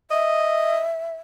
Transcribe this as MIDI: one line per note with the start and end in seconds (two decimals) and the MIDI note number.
0.11 0.84 75
0.11 1.16 76